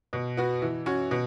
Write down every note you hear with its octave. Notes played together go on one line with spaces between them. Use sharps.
B2
B3 F#4
E3
C#4 F#4
B2